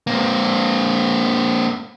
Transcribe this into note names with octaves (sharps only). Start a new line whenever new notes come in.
A#3 C4